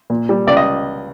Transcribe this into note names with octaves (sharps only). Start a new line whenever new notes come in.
A#2
G3
C#2 D5
D#5